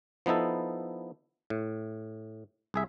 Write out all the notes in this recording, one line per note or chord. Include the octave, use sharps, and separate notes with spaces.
F3 B3 D#4 E4 A4
A2
C2 G#4 E5